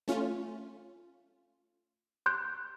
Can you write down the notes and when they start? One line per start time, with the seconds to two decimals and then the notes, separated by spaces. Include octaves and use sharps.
0.08 A3 C#4 F4
2.26 C6 F#6 G6